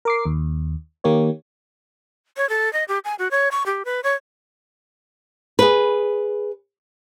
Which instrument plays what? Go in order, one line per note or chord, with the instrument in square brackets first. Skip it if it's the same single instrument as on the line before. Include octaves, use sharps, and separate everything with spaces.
[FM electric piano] A#4 D6 C7
D#2
D#3 A#3 G4 C#5
[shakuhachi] C#5
A4
D#5
G4
G#5
F#4
C#5
C#6
G4
B4
C#5
[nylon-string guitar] G#4 B4